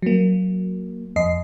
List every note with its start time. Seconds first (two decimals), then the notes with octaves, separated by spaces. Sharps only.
0.02 F#3 A#3
1.16 F2 D#5 C7